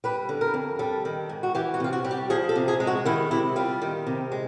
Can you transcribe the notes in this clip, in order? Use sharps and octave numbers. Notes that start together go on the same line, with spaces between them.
G3 B4
D3
A#4
F2
G3 A4
D#3
G#2
F#4
E3 G4
F#4
C3 F4
F#4
G3
G4
F3 G#4
A4
C3
G#4
G#3
F#4
D#3 E4
C3 E4
G3 F4
D#3
C3
G#3